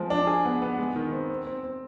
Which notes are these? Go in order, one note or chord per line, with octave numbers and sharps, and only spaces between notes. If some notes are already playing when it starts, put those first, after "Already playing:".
Already playing: F3 G#3 C4
D4
G#4
B3
B3
G#3
D#3
C4
C4
C4
C4